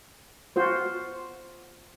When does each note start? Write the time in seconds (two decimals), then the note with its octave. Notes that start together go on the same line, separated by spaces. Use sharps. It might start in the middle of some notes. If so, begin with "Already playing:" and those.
0.56 F4 F#4 C5